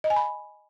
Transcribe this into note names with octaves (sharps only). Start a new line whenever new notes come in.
D#5
G#5
B5